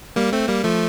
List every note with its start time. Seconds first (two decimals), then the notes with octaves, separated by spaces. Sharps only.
0.16 G3 A#3
0.32 A3 C4
0.48 G3 A#3
0.64 F3 A3